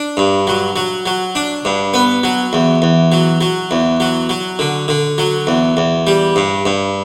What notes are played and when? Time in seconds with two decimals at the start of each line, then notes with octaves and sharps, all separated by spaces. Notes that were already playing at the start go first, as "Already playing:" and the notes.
Already playing: D4
0.17 G2
0.47 F#3
0.76 F#3
1.06 F#3
1.35 D4
1.65 G2
1.94 B3
2.23 F#3
2.53 E2
2.82 E2
3.12 F#3
3.41 F#3
3.71 E2
4.00 F#3
4.29 F#3
4.59 D3
4.88 D3
5.18 F#3
5.47 E2
5.77 E2
6.07 G3
6.36 G2
6.65 G2